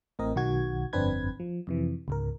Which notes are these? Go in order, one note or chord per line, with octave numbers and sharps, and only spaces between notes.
A1 A2 C4 A#4 D#5
B1 D#3 F#4 G#6
G1 F2 C4 D4 B4 G#6
F3
F2 C3 E3
C#2 G#2 A#4